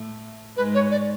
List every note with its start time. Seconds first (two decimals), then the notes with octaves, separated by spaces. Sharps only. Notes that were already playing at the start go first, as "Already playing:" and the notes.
Already playing: A2 A3
0.57 G#2 G#3 B4
0.74 C#5
0.91 D5